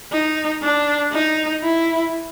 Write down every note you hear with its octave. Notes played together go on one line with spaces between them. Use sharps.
D#4
D4
D#4
E4